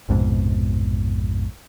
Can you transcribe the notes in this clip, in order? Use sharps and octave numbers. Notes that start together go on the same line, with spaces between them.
A#1 F2 G#2 B2